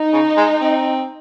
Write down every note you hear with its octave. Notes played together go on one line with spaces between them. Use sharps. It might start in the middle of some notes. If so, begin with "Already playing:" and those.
Already playing: D#4
C#3
G#3
C4